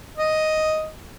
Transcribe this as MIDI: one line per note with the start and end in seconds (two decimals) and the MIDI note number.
0.17 0.86 75